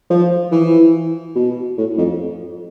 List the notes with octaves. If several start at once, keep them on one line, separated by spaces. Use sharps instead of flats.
F3
E3
B2
A2
F2